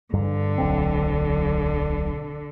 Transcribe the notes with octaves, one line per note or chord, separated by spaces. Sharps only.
G2 D3
D1 B1 C4